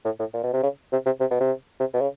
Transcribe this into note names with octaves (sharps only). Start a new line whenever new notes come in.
A2
A2
A#2
B2
C3
C#3
C3
C3
C3
B2
C3
C3
B2
C#3